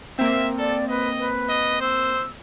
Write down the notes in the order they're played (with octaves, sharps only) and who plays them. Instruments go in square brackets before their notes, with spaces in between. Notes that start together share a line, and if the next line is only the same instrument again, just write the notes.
[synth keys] A#3 C4 [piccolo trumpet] E5
[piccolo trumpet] A4 [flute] D5
[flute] B4 [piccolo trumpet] D#5
[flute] B4
[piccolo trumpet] D#5
[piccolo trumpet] C5 [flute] E6